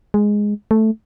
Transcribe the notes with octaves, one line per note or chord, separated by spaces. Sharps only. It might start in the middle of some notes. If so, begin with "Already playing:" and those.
G#3
A3